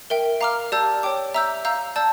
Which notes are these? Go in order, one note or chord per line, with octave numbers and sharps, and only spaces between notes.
A#4 E5 G5
F5 A#5 D6 F6
G4 D5 A5 E6 G6
C#5 G5 D6
E5 A#5 E6 G6
F5 A#5 E6 G6
D5 A5 E6 G6